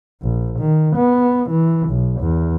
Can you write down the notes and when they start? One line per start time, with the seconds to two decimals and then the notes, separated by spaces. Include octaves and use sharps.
0.23 A#1
0.59 D#3
0.96 B3
1.50 E3
1.89 B1
2.20 E2